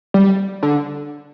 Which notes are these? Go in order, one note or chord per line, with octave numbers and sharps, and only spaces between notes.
G3
D3